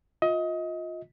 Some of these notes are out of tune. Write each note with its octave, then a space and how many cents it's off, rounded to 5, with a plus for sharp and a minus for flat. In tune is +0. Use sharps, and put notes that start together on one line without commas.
F4 +20 D#5 +30